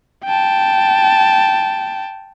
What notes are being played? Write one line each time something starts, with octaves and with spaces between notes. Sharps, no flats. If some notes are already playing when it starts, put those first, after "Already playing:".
G5 A5